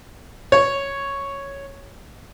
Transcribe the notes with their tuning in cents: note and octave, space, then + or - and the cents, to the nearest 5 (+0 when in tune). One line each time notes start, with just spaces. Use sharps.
C#5 +0